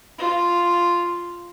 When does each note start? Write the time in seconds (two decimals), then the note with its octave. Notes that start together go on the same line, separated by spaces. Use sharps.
0.19 F4